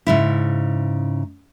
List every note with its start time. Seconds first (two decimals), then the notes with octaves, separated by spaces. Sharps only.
0.07 G#2 C#3 E4